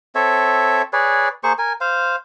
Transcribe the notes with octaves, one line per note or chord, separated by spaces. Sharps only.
C4 A4 C#5 E5
G#4 B4 C#5 D5
A#3 G#4 C5 C#6
A#4 G#5
C5 F5